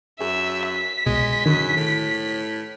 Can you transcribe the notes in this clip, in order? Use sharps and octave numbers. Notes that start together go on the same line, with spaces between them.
F#2 G#4 E5
B6
C2 B2 G#3
F#2 D3 D#3
A2